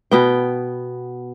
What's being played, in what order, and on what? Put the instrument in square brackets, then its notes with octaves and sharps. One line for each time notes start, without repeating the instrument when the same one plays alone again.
[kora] B2 B3 G5